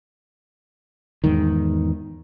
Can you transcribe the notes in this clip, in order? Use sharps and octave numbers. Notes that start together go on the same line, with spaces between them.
E2 G#2 D#3